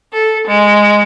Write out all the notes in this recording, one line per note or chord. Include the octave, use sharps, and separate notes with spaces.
A4
G#3